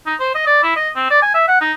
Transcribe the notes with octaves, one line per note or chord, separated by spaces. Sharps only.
D#4
C5
D#5
D5
E4
D#5
C4
D5
G#5
E5
F#5
D#4